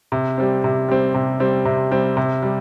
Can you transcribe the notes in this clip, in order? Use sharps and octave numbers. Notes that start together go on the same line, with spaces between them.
C3
G3 C4
C3
G3 C4
C3
G3 C4
C3
G3 C4
C3
G3